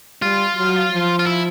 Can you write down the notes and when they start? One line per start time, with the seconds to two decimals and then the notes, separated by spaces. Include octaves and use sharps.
0.22 G3 F4
0.56 F#3
0.91 F3
1.19 F4
1.27 E4